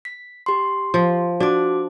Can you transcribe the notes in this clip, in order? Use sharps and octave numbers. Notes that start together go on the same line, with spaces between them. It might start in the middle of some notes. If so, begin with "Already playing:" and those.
B6
G4 C6
F3
D4 F#4 D6